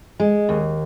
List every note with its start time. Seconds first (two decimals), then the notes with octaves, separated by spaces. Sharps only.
0.20 G#3
0.49 D#2